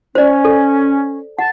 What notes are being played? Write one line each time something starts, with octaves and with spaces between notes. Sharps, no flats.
C#4 C5 D5
A4
F#5 A5